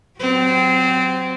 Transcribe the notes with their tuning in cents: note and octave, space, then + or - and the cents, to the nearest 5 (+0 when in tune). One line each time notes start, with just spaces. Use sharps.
F#3 +5 C4 -20 G4 -15